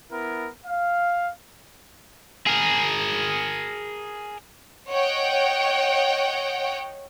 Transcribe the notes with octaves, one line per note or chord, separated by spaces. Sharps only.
B3 E4 A#4
F5
G#4 A#4
C#5 D#5 F#5 G5